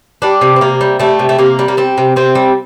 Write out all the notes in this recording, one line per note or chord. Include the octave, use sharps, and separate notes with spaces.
G3 D4
C3
C4
C3 A#3
G3
G3 A3
C3
A3
C3 A#3
G3
A#3
G3 C4
C3
C3 C4
G3